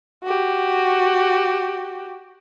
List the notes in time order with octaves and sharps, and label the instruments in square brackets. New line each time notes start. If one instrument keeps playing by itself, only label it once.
[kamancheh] F#4 G4